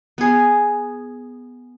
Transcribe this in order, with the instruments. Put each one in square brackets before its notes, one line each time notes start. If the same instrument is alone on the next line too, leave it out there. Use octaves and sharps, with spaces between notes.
[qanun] B3 G#4